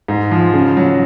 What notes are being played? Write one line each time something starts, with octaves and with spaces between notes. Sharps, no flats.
G#2
F3
C#3
F#3